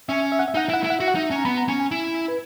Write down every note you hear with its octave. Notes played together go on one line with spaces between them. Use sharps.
C#4 E5
E5
F#5
E5
D#4 F#5
E5
E4 F#5
E4 E5
F#5
F#4 E5
F#5
D#4 E5
C#4
A#5
B3 B5
A#5
C#4 G#5
G#5
E4
B4